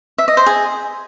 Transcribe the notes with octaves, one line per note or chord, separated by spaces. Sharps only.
E5
D#5
C5
G#4